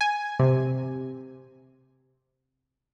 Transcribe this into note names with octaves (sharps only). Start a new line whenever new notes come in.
G#5
C3